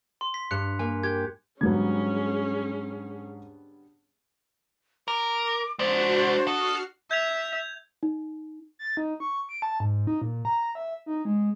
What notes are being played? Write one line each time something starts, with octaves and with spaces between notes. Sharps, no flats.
C6
B6
G2 F#6 C#7 F7
A#3 G#5
G4 G#6
G#2 D3 F#3 G3 B3 C#4 G#4 G#6
A#4 D6
G#3 D4 F#4 C5 D5
F#4 A4 D#6 F6 C7
E5 G6 G#6 F7
D#4
A6
D#4
C#6
D7
A5
G#2
D#4
A#2
A#5
E5
D#4
G#3